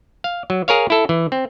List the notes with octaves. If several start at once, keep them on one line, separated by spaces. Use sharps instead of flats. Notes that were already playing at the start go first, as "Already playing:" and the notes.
F5
F#3
G#4 A#4 C#5 F5
E4 A4
E3
C4